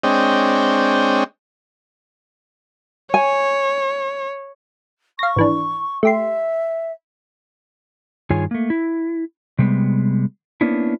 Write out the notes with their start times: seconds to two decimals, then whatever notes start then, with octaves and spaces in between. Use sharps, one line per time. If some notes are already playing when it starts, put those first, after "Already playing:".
0.03 G#3 C4 D4 C#5 D#5 G5
3.14 C#5 G#5
5.19 F5 C#6 A#6
5.36 G#1 E3 D4
6.03 A3 G4 E5 C6
8.30 G2 D#3 F4 G#4 C#5 G#5
8.51 A3 A#3
8.70 E4
9.59 C3 G3 G#3 B3
10.61 A#3 B3 C#4 D4 E4